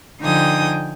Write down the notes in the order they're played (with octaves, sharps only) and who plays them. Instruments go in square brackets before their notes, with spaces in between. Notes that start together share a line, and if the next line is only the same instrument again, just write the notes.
[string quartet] D3 F3 D#4 G5 G#5 D#6